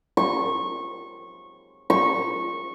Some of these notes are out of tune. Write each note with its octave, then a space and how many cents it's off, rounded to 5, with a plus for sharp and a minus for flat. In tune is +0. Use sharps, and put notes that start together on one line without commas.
C#6 -20
C#6 -15